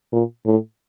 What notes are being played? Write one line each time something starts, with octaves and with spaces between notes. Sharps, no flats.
A#2
A2